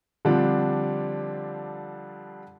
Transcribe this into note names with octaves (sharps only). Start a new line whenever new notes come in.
D3 F3 G3 C4 D4